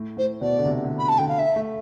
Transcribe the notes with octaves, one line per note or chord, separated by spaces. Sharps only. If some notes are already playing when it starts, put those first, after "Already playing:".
Already playing: A2
A2 C5
B2 D5
D3
C3
D3
B5
A5
D3 G5
F5
E5
A3